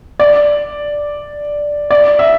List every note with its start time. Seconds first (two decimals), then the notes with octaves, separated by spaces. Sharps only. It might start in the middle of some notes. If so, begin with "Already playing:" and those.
0.20 D5
1.90 D5
2.19 E5